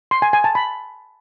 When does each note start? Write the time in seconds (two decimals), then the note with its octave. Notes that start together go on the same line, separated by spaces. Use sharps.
0.11 C6
0.22 G#5
0.33 G#5
0.44 A5
0.55 B5